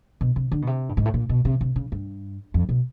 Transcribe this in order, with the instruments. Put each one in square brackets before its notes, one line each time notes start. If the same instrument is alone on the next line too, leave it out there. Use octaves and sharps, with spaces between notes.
[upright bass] B2
C3
D3
B2
C3
G2
G#2
A2
A#2
B2
C3
C3
C#3
G2
F2
B2